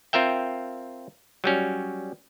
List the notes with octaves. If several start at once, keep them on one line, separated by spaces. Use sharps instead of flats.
C4 F4 A#4 E5 G5
F#3 G3 C#4